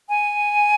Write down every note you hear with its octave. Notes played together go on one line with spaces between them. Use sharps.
G#5